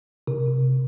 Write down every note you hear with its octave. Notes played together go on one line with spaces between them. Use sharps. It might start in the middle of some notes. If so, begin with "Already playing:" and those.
C3